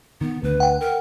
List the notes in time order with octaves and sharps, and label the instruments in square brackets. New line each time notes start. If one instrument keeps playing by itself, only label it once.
[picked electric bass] D#3 [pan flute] B3
[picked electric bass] D2 [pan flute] B4
[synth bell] F#5 G5
[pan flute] A#4